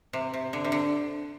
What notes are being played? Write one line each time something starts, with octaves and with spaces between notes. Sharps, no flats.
C3
C3
D3
C3
D3